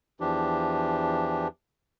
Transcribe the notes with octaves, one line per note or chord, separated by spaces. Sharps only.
E2 E3 F3 D4 G4